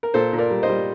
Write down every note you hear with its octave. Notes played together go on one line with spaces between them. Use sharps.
A#4
A#2 A4 C5
A#2
A#4 D5
G3
C5 D#5
G3